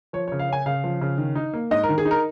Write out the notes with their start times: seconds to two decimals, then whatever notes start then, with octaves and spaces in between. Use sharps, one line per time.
0.13 F3 C#5
0.28 C#5
0.32 C#3
0.39 F5
0.48 C#4 G#5
0.66 C#3 F5
0.84 F3
1.01 C#3
1.18 D#3
1.35 D#4
1.53 A#3
1.71 G#2 D#5
1.83 A#4
1.89 D#3
1.98 G#4
2.05 D#4
2.11 A#4